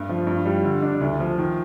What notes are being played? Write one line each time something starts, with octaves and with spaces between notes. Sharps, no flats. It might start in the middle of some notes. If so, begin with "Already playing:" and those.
Already playing: G2 A3
F3
G2
G3
D3
D4
D2
F3
D#3